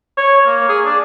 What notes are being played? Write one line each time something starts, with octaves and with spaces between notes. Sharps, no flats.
C#5
A#3
G#4
D4